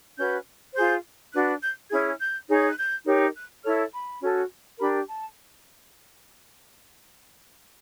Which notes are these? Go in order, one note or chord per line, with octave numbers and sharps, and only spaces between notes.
C#4 F#4 B4 G6
F4 G#4 C5 G6
D4 F#4 B4 F#6
G6
C#4 E4 G#4 G#6
G6
D#4 G#4 C#5
F#6
G6
D#4 G4 A#4 C#5
F#6
E4 A4 C#5 F6
B5
C#4 F#4 A4
D4 G4 A#4 B5
A5